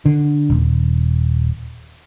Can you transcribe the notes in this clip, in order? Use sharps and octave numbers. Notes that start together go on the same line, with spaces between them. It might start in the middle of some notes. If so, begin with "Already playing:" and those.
D3
D#1